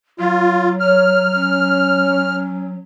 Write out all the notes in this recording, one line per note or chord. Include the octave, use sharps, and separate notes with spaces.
F#3 F4
C#5 F6
C#4